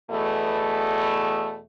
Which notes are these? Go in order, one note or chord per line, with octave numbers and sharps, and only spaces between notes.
E2 B2 A3